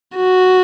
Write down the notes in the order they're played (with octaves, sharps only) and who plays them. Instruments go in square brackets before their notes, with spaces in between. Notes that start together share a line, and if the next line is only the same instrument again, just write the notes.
[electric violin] F#4